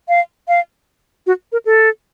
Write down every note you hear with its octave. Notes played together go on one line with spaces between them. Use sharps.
F5
F5
F#4
A#4
A4